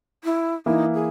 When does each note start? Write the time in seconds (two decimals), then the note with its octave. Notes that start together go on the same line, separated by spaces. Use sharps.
0.24 E4
0.66 E3 A#3 D#4 E4
0.94 G#4